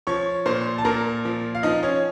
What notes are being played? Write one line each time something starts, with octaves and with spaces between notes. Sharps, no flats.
F3 C#5 C#6
A#2 C5 C6
A5
A#2 A#4 A#5
F3
F5
F3 D#4 D#5
C#4 C#5